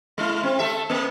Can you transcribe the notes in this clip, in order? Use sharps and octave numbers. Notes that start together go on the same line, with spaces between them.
G#3 E4
C4
A3 A4 E5
A#3